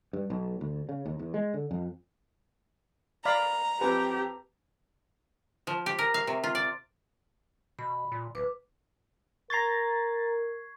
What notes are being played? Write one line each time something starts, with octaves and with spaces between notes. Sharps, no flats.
G2
B1
D2
C#3
D#2
E2
G#3
D3
F2
D5 F5 A#5 B5
F2 C4 G4 B4 G#5
F3
G4
A#4
F5
C3
F4
D5
B2 B5
A#2
D1 B4 D6
A#4 A#5 C#6 G#6 A6 C7